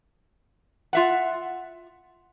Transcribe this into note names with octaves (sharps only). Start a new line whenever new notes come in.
F4 E5 F#5